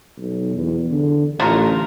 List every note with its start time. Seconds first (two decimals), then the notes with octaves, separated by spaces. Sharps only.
0.17 B1
0.54 E2
0.91 D3
1.40 A1 A3 F4 A#4